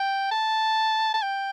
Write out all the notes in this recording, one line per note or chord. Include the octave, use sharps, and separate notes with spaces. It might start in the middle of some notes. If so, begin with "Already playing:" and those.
Already playing: G5
A5
A5
G5